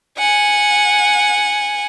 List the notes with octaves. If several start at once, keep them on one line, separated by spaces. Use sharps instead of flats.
F#5 G#5